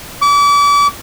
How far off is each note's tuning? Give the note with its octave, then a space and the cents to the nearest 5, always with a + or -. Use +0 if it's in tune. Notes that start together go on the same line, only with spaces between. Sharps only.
D6 -35